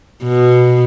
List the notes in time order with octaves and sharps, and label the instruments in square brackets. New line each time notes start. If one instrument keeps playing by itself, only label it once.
[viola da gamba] B2